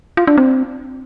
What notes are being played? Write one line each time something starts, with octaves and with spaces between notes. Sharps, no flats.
F4
D4
C4